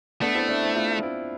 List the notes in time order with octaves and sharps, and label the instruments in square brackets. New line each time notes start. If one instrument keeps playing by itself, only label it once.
[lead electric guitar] A3 [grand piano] B3 D4
[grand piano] C4 E4
B3 D4
C4 E4
D4 F4
C4 E4